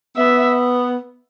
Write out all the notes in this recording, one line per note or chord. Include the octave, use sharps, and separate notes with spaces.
B3 E5